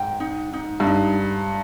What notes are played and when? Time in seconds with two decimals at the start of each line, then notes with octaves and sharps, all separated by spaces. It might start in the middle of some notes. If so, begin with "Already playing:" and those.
Already playing: G#2 G5
0.20 D#4
0.53 D#4
0.80 G2
0.87 D#4